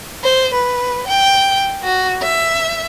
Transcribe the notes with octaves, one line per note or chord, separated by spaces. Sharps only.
C5
B4
G5
F#4
E5